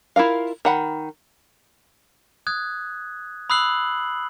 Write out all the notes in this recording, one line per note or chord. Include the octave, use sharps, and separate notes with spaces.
E4 F4 A#4 F5
D#3 F#5 B5
D#6 F#6 G#6
B5 D#6 E6 F#6 C7 F#7